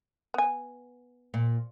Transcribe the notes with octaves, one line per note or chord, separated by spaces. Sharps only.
B3 G#5
A#2